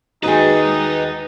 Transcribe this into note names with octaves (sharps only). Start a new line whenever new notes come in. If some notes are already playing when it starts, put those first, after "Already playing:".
D#2 D#4 F#4 G#4 B4 G5